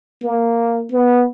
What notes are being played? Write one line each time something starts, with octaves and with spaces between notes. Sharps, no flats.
A#3
B3